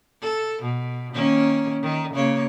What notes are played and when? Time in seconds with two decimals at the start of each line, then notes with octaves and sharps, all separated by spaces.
0.21 A4
0.62 B2
1.13 D#3 A#3 C#4
1.82 D#3
2.14 C#3 A#3 C#5